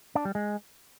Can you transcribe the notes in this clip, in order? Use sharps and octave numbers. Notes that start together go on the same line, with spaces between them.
D4
G3
G#3